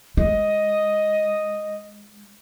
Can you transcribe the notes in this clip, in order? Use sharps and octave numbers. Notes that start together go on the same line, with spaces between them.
G#3 D#5